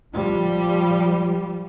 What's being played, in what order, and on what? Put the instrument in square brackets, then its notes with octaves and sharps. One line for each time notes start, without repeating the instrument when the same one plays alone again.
[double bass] F3 G3